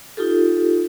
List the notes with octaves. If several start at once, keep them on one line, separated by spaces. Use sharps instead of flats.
D#4 F4 G4 A4